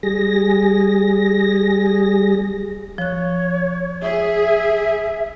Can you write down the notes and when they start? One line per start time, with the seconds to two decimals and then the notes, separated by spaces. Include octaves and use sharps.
0.03 G3 G#4 A#6
2.98 F3 C#5 F#6
4.02 G#4 E5